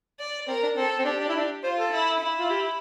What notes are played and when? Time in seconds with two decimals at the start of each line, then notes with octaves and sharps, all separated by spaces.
0.20 D5
0.48 C4 A#4
0.63 D4
0.77 C4 A4
0.99 C4
1.05 D4 G4
1.20 D4
1.29 E4
1.36 D4
1.63 F4 C5
1.77 A4
1.92 E4
2.20 E4
2.39 F4
2.50 G4